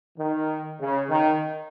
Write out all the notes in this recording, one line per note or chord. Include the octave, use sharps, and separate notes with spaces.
D#3
C#3
D#3